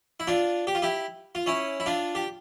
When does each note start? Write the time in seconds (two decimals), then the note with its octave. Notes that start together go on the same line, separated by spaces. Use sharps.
0.20 E4
0.27 D4 F4
0.67 G4
0.75 F4
0.82 E4 G4
1.35 F4
1.46 C#4 E4
1.80 E4
1.86 D4 F4
2.15 G4